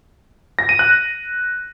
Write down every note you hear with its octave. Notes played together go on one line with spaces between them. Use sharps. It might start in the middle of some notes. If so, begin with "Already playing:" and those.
A#6
D#7
F#6